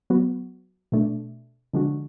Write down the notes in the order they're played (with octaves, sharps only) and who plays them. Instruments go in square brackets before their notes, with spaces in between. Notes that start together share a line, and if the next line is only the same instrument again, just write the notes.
[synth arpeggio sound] F#3 B3 F#4
B2 A3 D4
D3 F3 G#3 D4 F#4